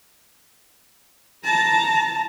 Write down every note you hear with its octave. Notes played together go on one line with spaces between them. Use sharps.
A5 A#5